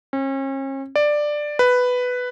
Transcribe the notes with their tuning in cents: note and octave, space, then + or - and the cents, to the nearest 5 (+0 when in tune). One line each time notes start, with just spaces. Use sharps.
C#4 -40
D5 +10
B4 +5